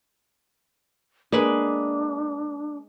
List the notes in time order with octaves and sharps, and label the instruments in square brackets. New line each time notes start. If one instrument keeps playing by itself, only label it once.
[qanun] G#3 B4 G#5 [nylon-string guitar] A#3 [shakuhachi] D4